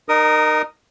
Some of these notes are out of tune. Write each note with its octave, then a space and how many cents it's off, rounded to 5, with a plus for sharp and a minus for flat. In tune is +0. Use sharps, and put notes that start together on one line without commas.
D#4 -30 A#4 +0 D#6 +0